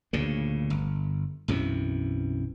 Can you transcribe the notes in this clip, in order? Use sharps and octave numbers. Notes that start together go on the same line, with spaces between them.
D2 A#2 C#3
G1
B1 F#2 C3 E3